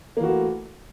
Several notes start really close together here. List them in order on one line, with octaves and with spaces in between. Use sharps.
A#3 E3 F#4 A3